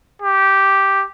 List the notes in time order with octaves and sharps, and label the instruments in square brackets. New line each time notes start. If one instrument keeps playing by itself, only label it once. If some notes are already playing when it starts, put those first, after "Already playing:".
[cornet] G4